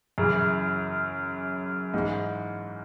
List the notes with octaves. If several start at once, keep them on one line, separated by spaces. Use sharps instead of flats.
F#2 C#3 E3
G#2 E3 G#3